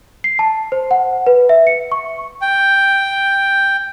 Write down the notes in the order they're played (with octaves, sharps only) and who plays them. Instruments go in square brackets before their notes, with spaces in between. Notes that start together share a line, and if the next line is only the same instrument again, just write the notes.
[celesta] C7
A5
C5
F#5
B4
E5
C#7
C#6
[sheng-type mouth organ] G5